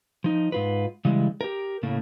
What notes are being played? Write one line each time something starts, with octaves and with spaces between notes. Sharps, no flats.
F3 D#4
G#2 F4 B4
C#3 E3 G3 G#3
G4 A#4
A2 C#3 A3 A#3